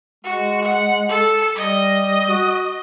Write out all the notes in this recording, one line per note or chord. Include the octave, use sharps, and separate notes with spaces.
G#3 F#4
F#5
A4
G3 D#5
F#4